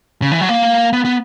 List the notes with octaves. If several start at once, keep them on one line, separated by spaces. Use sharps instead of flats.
C#3
E3
F#3
A#3
B3
B3